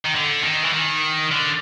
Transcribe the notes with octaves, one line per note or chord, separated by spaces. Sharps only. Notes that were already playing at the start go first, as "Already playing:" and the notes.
D#3
D3
D#3
E3
D#3
D3